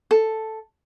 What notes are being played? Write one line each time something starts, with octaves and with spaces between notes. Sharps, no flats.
A4